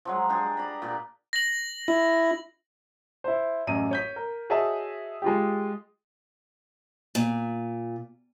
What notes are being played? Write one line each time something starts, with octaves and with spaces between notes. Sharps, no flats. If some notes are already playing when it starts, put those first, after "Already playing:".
F3 F#3 G#3
D4 G4 G#4
D5 A#5 B5
A#2 G4 D5
A#6 F#7
E4
E4 C5
A1 F#2 D#7
C#5 G6 B6
A#4
F#4 G#4 C#5 D#5 E5 A5
G#3 F4 G4
A#2